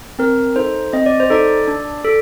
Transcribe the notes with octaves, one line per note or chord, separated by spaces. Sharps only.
C4 A#4
D#4 A4 C5
C4 D#5
D5
C5
D#4 A4 D5
D4
A4